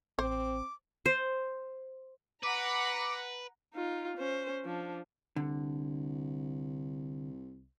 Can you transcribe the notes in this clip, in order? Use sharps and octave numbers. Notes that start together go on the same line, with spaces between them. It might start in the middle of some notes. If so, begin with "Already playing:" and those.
A1 C4 C5 D6
C5
B4 F#5 A#5 B5 D6
D#4 F4
C#4 C5
F3 D4
C2 D3